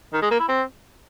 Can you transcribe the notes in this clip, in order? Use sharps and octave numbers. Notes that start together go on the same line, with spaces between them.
D#3
G#3
A#3
E4
C4